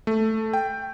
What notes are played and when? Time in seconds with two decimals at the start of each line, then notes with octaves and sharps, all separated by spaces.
0.07 A3
0.53 G5